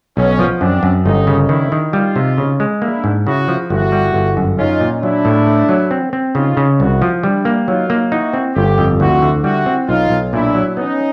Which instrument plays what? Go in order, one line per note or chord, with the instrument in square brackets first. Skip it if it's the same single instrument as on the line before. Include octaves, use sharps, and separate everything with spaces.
[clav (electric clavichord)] B1 [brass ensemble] B3 C#4
[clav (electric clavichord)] F3
[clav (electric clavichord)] F#2 [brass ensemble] C4 D4
[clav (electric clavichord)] F#2
[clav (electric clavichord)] G1 [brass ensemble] C#4 D#4
[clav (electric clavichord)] C#3
[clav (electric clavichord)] D#3 [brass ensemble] D4 E4
[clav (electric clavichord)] D#3
[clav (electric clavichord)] G3 [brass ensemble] D#4 F4
[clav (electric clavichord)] C3
C#3
G#3
[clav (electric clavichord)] A#3 [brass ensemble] D4 E4
[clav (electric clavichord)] G#2
[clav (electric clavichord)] C#3 [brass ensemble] E4 F#4
[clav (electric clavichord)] F3
[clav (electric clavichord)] G1 [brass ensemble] E4 F#4
[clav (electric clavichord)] G3
G1
F#2
[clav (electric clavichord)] C#4 [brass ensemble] D#4 F4
[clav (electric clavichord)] A#2
[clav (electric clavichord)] F#3 [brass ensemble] D4 E4
[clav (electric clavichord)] A2
A3
F#3
C4
C4
[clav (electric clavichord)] C#3 [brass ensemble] D#4 F4
[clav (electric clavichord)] C#3
[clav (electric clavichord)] C2 [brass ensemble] E4 F#4
[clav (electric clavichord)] F3
[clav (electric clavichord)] G3 [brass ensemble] D4 E4
[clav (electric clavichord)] A#3
[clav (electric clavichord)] F#3 [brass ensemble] D#4 F4
[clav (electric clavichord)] A#3
[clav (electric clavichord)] D#4 [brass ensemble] E4 F#4
[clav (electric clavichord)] C4
[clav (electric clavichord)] G1 [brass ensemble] F4 G4
[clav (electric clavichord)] F2
[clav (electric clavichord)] D2 [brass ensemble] E4 F#4
[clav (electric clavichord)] D3
[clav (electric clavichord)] G3 [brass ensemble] E4 F#4
[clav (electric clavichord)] C4
[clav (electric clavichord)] B1 [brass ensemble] D#4 F4
[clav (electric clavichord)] B1
[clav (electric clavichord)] A#2 [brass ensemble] D4 E4
[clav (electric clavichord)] F#3
[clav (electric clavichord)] B3 [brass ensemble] C#4 D#4